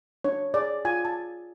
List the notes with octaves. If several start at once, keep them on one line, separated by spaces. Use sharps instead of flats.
D4 C#5
G#4 C#5 D5
F4 G#5
A5